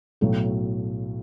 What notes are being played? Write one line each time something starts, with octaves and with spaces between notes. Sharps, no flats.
B1 A2 F#3 A3